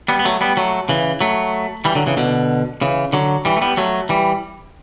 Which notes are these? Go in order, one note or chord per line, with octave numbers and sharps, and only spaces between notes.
G3 B3
B3
F#3 A3
G3 B3
F#3 A3
C#3 E3
F#3 A3
E3 G3
D3 F#3
C#3 E3
B2 D3
C#3 E3
D3 F#3
E3 G3
A3
G3 B3
F#3 A3
E3 G3